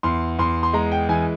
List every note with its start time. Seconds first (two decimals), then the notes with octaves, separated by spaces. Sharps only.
0.03 E2 C6
0.39 E2 C6
0.63 C6
0.73 G#3 A#5
0.92 G5
1.09 E3 G#5